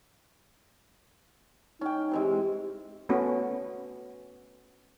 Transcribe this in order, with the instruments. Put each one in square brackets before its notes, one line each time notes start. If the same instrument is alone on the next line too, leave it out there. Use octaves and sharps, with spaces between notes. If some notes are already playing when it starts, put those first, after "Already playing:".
[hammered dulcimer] C#4 G5 [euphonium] D#4
[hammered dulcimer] C3 E3 G#3
[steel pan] A3 B3 C#4 F#4